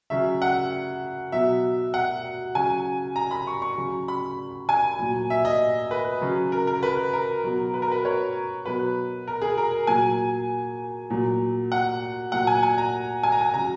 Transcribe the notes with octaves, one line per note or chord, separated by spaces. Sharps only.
C#3 F#3 E5
F#5
B2 F#3 E5
F#5
C#3 F#3 G#5
A#5
B5
C#6
C#6
C#3 F#3
B5
G#5
A#2 F#3
E5
D#5
B4
C#3 F#3
A#4
A#4
B4
A#4
B2 F#3
B4
A#4
B4
C#5
B2 F#3 B4
A#4
G#4
A#4
A#2 F#3 G#5
A#2 F#3
F#5
A#2 F#3 F#5
G#5
G#5
A#5
G#5
A#5
G#5
C#3 F#3 A#5